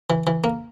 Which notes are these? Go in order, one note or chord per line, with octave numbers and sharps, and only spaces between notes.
E3
E3
A#3